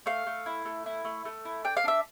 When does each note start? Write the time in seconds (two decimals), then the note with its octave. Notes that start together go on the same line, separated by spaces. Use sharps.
0.06 A3 F5
0.27 A3
0.46 E4
0.65 A3
0.86 E4
1.05 A3
1.25 A3
1.45 E4
1.64 D4 G5
1.77 F5
1.84 D4 E5